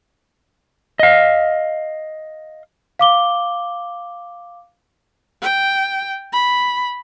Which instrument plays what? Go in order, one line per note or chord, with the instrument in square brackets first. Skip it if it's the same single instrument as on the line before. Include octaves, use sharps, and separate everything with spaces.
[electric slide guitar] D#5 F5
[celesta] F5 D6 G7
[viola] G5
B5